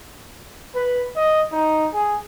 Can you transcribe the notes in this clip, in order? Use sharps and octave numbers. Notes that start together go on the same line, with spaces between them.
B4
D#5
D#4
G#4